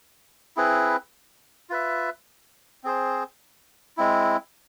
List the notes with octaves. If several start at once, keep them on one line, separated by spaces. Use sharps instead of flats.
C4 E4 G#4 B4
F4 B4 E5
C4 G#4 C5
G#3 C4 E4